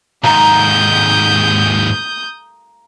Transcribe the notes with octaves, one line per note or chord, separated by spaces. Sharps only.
D#2 G#2 A#5 D#6 G6